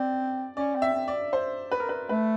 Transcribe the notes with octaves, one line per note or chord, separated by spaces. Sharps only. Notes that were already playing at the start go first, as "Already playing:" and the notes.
Already playing: C4 D5
C#4 D5
C4
E5
C4
D5
C5
B4
A#4
B4
A3 B4